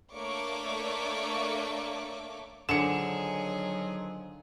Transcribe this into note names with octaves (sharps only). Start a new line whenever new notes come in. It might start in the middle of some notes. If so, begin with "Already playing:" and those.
A3 A#3 D4 C#5 C#6 D6
D3 D#3 F3 F#3 G#4 C#7 E7